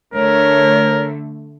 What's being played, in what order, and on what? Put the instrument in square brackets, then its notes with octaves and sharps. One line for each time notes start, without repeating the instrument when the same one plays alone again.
[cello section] D3 A3 [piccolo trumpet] A#4 [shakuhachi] C#5